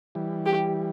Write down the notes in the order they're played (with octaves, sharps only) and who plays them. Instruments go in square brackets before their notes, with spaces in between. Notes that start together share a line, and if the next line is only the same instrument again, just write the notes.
[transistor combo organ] E3 G3
[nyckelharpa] G4